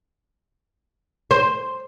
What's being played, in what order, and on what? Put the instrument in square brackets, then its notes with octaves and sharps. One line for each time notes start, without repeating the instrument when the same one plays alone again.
[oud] C5